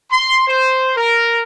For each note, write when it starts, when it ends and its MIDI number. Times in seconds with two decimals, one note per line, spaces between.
0.11 0.45 84
0.48 0.92 72
0.97 1.40 70